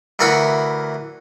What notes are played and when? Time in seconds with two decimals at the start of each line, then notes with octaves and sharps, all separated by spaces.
0.19 D2 E3 A#4 F5 F#5 B5